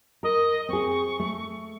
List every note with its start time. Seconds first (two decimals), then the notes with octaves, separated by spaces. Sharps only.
0.23 A#4 D#5
0.69 C4 G#4 C#6
1.19 A3